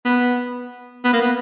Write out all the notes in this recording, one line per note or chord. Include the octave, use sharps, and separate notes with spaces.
B3
B3
A#3
B3